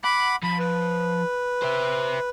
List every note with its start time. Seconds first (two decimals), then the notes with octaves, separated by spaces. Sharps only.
0.04 F#5 B5 D6
0.43 F3 B5
0.59 B4
1.62 C5 E5